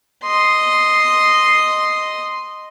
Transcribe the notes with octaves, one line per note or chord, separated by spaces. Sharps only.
D#5 C6